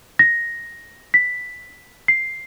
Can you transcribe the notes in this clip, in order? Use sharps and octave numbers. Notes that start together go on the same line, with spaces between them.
A#6
B6
C7